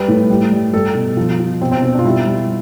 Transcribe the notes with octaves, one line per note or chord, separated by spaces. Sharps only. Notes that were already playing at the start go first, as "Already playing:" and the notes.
Already playing: G3 B4
A2
G3
G3
G3 A4
B2
F3
F3
B2 C4
C4
B2 C4
D4
F4
G3 E4
G3